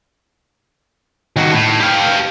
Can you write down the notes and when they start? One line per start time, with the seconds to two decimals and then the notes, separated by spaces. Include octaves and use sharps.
1.36 D#3 F#4
1.52 A2
1.80 G4 F5